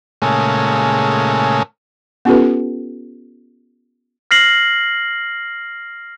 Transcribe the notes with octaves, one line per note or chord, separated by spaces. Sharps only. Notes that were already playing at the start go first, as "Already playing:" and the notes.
A#2 C#3 G#3 A3
B3 C#4 F4 G4 A4 B4
F6 A#6 C7 F#7